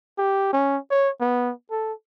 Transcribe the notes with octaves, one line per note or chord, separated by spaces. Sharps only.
G4
C#4
C#5
B3
A4